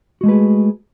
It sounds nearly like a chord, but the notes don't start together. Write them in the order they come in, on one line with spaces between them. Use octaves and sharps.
F#4 G#3 A3 B4 G#4